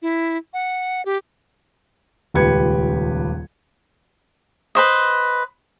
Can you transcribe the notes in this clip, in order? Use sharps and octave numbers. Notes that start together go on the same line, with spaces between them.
E4
F#5
G4
D#1 C#2 G4 B4 G#6 C#7
B4 C5 D#5